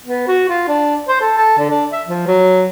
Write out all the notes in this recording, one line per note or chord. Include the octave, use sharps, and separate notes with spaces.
B3
F#4
F4
D4
C5
A4
A4
D3
D4
E5
F3
F#3